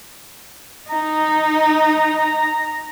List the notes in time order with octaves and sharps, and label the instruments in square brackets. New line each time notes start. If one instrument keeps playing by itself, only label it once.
[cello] D#4 [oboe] A#5